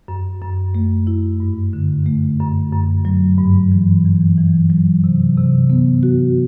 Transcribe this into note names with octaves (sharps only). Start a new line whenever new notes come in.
F#2
F#2
A3
E4
G2
D3
A3
F#2
F#2
F#3
G2
E3
E3
E3
F#3
C3
C3
B3
F#4